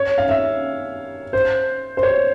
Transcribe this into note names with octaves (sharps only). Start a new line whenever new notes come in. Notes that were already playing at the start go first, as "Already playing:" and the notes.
Already playing: C#5
F5
E5
C5
C5
C#5